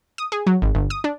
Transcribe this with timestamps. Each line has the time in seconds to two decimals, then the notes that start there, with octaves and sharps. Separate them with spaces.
0.18 D#6
0.32 G#4
0.47 F#3
0.62 G#1
0.75 G1
0.90 D#6
1.04 D4